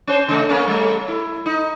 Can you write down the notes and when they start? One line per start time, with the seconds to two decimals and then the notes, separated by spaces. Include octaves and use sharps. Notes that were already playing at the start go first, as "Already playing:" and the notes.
0.07 C#4 C5
0.28 C#3 A3
0.49 A#3 C#4
0.67 G3 A3
1.08 E4
1.46 D#4